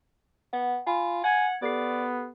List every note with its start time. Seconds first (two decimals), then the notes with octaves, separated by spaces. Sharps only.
0.53 B3 F#5
0.86 F4 G#5 B5
1.24 F#5 G#5 G#6
1.62 B3 G4 A4 D5 C7